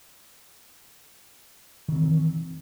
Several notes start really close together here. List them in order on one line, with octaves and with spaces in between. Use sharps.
D#3 C4 E3